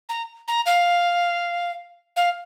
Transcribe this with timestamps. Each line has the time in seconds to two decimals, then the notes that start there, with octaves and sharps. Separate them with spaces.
0.09 A#5
0.48 A#5
0.66 F5
2.16 F5